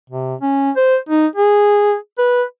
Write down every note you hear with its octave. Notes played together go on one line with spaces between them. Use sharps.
C3
C#4
C5
D#4
G#4
B4